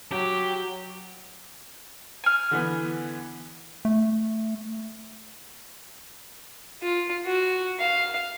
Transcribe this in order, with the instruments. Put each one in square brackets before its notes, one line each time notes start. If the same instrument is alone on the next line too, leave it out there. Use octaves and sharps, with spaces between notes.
[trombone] F#3 [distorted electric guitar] G4
[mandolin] G#5 F6
[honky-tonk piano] D3 E3 B3
[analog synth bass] A3
[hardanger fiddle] F4
F#4
F5